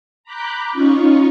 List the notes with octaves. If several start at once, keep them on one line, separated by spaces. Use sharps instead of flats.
A#5 B5 D6 F#6 G6
C#4 D#4 F4 C#5